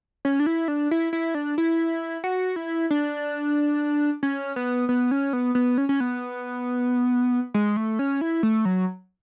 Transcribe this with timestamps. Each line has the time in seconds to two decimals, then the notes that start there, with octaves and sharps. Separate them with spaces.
0.25 C#4
0.40 D4
0.46 E4
0.68 D4
0.91 E4
1.13 E4
1.35 D4
1.58 E4
2.24 F#4
2.56 E4
2.91 D4
4.23 C#4
4.56 B3
4.89 B3
5.11 C#4
5.33 B3
5.55 B3
5.78 C#4
5.89 C#4
6.00 B3
7.54 G#3
7.77 A3
7.99 C#4
8.21 E4
8.43 A3
8.65 F#3